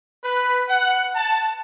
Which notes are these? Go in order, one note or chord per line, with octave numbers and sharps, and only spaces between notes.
B4
F#5
A5